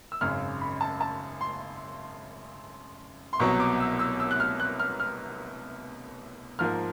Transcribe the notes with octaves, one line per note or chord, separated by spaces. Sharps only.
E6
G#1 F#2 C#3 F6
B5
A5
A5
C6
C6
C2 B2 F#3 C#6
D6
E6
E6
E6
F#6
F6
F#6
F6
F6
G#2 F3 A#3 F6